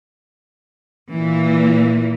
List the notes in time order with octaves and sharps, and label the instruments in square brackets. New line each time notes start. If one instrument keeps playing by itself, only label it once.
[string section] A#2 E3